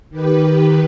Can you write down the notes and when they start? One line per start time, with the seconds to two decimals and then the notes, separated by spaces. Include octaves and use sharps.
0.10 D#3 G4 B4